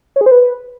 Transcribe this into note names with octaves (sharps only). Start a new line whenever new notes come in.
C#5
G#4
C5
B4